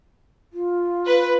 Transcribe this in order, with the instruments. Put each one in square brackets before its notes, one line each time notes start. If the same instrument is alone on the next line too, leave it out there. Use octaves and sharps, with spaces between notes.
[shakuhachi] F4
[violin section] B4